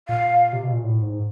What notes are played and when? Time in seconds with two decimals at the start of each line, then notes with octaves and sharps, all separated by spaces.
0.08 A#2 F5
0.53 C3
0.64 B2
0.73 A#2
0.84 A2
1.02 G#2